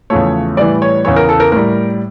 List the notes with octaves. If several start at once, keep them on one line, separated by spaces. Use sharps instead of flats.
E2 C#3 F3 A3 C#5
A2 E3 G3 D5
C#5
E2 C#3 E3 C#5
A#4
A4
A#4
A2 G3 A#4